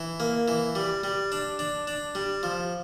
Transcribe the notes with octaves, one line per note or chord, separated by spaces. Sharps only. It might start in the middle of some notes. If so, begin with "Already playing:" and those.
Already playing: E3
A#3
E3
G3
G3
D4
D4
D4
G3
F3